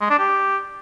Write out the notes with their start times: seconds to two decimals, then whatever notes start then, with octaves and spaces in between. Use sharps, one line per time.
0.01 G#3
0.10 D4
0.19 G4